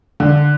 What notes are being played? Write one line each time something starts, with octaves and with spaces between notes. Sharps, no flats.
D3